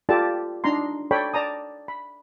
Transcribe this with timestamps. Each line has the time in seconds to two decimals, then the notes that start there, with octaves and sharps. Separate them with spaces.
0.09 F4 G4 A4 D5 A5
0.64 D4 D#4 A#5 C6
1.11 A4 C#5 D5 G5 B5
1.34 D5 A5 A#5 D#6
1.88 B5